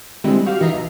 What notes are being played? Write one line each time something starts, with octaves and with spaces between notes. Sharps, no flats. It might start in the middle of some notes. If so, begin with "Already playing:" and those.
D3 D#3 G3 G#3 C4 E4
F#4 G4 F5
D#3 E3 D#5 E5 A#5 C7
B1